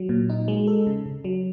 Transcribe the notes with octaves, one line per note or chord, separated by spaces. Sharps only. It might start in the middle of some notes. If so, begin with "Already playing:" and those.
Already playing: F#3
A#2
D#4
G#3
A4
C#3
C#3
F#3